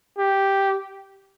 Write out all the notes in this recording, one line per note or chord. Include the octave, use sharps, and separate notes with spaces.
G4